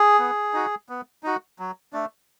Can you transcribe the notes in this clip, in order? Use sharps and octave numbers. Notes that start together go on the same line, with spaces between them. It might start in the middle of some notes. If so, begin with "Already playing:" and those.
Already playing: G#4
B3
D#4 F#4
B3
D#4 F#4
F#3
A3 D4